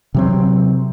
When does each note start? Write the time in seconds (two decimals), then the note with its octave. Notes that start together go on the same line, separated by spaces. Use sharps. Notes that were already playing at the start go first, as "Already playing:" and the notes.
0.14 C3 F#3 C4